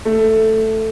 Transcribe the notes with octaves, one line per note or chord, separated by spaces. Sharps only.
A3